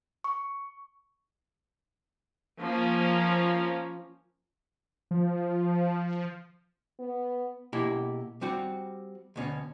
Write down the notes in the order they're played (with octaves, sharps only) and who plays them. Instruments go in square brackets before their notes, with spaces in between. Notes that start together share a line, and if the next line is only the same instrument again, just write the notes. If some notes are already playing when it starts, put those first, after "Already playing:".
[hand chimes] C#6
[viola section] F3 A#3 C#4
[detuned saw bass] F3
[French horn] B3
[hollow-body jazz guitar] B2 A#3 E4 G4 G#4
G3 C4 F#4
D2 B2 C#4